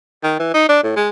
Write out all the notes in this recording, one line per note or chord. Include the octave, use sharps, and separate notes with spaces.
D#3
E3
D#4
D4
A2
G#3